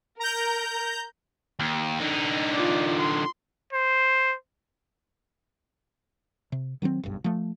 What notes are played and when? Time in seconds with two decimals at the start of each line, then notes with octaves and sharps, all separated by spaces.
0.20 A#4 A#5 G6
1.60 D#2
2.00 D3 D#4
2.54 F4 D5
2.99 C6
3.73 C5
6.52 C3
6.82 D#3 F#3 G#3 C4
7.03 F#1 B1 G2
7.24 F3 A3